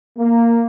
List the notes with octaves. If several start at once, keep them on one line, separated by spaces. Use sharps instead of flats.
A#3